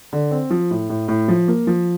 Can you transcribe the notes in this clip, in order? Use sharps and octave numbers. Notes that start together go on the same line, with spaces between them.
D3
C4
F3
A2
A2
A2
F3
A#3
F3